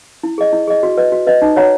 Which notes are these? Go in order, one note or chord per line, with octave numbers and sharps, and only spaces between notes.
E4
G#4 D#5
E4
G#4 D#5
F#4
B4 D#5
F#4
B4 D#5
D#4
F#4 C#5 F#5 A#5